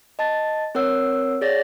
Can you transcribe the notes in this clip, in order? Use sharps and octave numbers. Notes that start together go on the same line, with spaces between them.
D#5 A5 A6
C4 A#4 C#5 F#5 E6
G#4 C#5 D5 A6 A#6